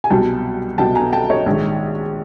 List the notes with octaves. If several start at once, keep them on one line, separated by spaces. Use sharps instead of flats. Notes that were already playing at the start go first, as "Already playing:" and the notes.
G#5
C2 B2 F#3 G5 A5
C2 B2 F#3 G5 A5
G#5 A#5
G5 A5
C#5 D#5
A#1 G#2 D#3